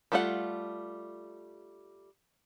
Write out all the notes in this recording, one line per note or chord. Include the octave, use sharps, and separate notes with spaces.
G3 A3 F4 A#4 F#5